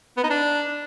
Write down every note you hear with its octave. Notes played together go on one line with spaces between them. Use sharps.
B3
D#4
D4